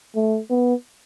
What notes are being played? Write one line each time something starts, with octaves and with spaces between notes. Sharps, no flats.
A3
B3